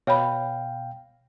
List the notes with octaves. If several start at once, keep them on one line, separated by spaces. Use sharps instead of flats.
B2 C#5 F5 G5 B5